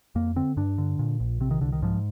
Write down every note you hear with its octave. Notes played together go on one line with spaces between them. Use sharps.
F2 A#3
D3 C4
G2 D4
D3
A#2
A#1
C3 C4
D#3
C2 D3
D#3
G#2 F3